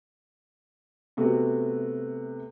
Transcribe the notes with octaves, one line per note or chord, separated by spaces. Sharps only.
C3 A3 B3 F#4